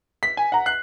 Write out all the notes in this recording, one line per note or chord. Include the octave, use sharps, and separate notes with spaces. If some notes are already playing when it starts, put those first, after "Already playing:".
B6
G#5
F#5 A#5
F#6 C7